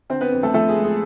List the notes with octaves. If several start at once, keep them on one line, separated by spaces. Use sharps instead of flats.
D3 C4 C5
B3 B4
F2
A3 A4
F3 A3 A4
G#4
G#3
G#4